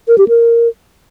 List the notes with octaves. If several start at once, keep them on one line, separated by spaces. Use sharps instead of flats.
A#4
G4
A#4